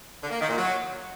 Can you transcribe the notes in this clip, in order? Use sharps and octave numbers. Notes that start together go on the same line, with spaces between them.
D3
A#3
D#3
A#2
F#3